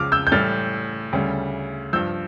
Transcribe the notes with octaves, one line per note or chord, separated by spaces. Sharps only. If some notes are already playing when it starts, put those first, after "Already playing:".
Already playing: C#2 C#3 F3 D6 F6
E6 G6
G6
A2 E3 G3 F6 A6
D2 C#3 G3
G2 F3 E6 G6